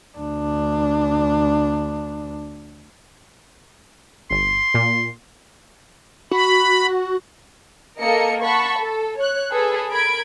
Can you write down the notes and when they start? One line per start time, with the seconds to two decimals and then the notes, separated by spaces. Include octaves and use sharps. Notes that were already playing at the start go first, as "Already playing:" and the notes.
0.18 D2 D4
4.30 G1 C6
4.74 A#2
6.31 F#4 B5
8.00 A#3 A4 A#4 D#5 C#7
8.42 F#5 A5 B5 C#6
8.79 A4
9.17 C#5 F#6
9.52 G#4 A4 B4
9.90 A#4 B5 G#6 D7